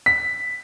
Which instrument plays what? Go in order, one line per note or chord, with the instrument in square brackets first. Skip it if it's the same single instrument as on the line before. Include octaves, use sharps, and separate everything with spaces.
[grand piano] B6